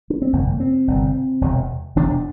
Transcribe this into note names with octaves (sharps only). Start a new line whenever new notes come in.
D4
C4
G1 F2 C3 A#3
C4
G1 F2 C3
E1 E2 C3
E1 E2 C3 D4